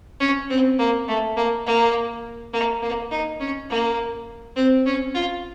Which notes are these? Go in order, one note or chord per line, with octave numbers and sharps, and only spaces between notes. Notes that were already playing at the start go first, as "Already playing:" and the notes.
C#4
C4
A#3
A3
A#3
A#3
A#3
A#3
D#4
C#4
A#3
C4
C#4
F4